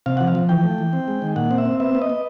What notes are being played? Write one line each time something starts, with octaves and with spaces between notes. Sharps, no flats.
C3 F5
F3 F#5
F5
F3
E3 G5
A3
E3
C4
G#3
D#3
A#2 F#5
C4
E5
C4
B3 E5
B3
D#5
B3